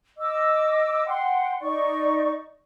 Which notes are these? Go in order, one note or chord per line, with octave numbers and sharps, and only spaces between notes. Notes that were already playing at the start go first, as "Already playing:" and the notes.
D#5 D6 E6
F#5 G5 C6
D#4 D5 C#6